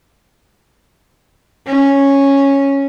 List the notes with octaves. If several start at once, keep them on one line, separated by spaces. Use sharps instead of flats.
C#4